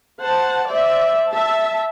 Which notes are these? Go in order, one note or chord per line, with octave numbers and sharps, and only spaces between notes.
C5 F#5 A5
C5 D5 E5
E5 A5